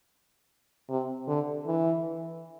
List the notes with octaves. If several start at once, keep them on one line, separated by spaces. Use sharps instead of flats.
C3
D3
E3